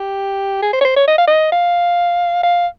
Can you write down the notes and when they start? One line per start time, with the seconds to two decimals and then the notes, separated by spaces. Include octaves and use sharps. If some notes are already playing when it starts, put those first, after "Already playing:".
Already playing: G4
0.62 G#4
0.73 C5
0.81 C#5
0.85 C5
0.96 C#5
1.08 D#5
1.18 F5
1.27 D#5
1.52 F5
2.43 F5